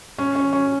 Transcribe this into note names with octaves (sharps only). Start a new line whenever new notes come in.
C#4
C#4
C#4